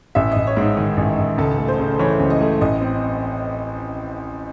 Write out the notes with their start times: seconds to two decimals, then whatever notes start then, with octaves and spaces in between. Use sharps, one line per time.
0.15 A1 E5
0.32 A1 D#5
0.47 C#5
0.57 G#2
0.62 D#4
0.77 D#3 D#4
0.97 A1
1.18 A1
1.38 C#2 A4
1.59 A3
1.68 C5
1.79 C#3
1.99 E3 C#5
2.20 C#2
2.30 D#5
2.41 A3
2.61 A1 D#5
2.81 C4